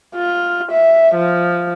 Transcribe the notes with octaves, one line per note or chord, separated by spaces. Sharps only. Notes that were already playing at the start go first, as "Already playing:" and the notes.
F4
E5
F3